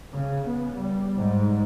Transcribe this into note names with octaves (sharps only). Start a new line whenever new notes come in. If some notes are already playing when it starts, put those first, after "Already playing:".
C#3
B3
G3
G#2